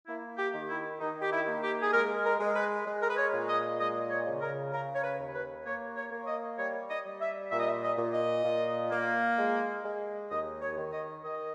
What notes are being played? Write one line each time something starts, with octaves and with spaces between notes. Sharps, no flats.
A#3 E4
G4
D#3
E4
D#3 D#4
G4
E4
A#3
G4
G#4
G#3 A#4
A#4
G#3
B4
G#3
A#4
B4
C#5
A#2
D#5
G#3 D#5
C#5
C#3
A#4
C#3 A#4
C#5
B4
D#2
B4
A#3 C#5
C#5
A#3
C#5
D#5
G3 C#5
D#5
G3
E5
A#2 E5
D#5
E5
D#5
A#2
D#5
A#2
A#3
G#3
G#3
D#2 D#5
C#5
D#3
D#5
D#3 D#5